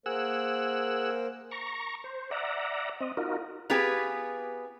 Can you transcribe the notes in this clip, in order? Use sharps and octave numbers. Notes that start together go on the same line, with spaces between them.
A#3 G#4 A#4 C5 F#5 E6
A#5 C#6
C5
D5 E5 F#5 A#5
C4 D#5
D#4 F4 F#4 A#4
B3 F4 G4 G#4 B4